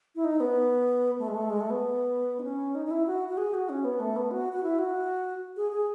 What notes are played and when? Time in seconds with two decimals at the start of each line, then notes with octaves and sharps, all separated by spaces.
0.16 E4
0.24 D#4
0.40 B3
1.19 A3
1.28 G#3
1.34 A3
1.50 G#3
1.61 A3
1.70 B3
2.39 D#4
2.44 C#4
2.75 D#4
2.86 D#4
2.91 E4
3.07 F#4
3.29 F#4
3.37 G#4
3.54 F#4
3.69 C#4
3.84 B3
4.00 A3
4.16 B3
4.31 F#4
4.53 F#4
4.63 E4
4.79 F#4
5.57 G#4
5.73 G#4